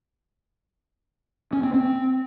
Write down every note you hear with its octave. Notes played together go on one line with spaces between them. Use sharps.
C#4
C4
C4